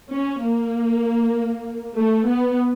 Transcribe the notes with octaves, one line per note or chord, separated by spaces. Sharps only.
C#4
A#3
A3
B3